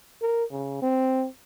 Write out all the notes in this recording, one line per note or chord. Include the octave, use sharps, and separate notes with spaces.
A#4
C#3
C4